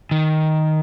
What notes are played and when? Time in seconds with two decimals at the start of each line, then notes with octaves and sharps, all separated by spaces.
0.11 D#3